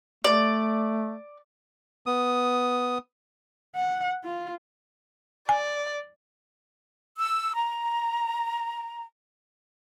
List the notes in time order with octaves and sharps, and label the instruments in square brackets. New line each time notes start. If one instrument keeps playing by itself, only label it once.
[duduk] A3 [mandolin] D5
[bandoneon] B3 D#6
[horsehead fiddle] F#5
F4
[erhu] D5 [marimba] G#5
[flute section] E6
A#5